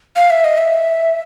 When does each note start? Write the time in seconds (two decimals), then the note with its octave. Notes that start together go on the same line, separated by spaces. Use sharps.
0.16 F5
0.30 E5
0.44 D#5
0.58 E5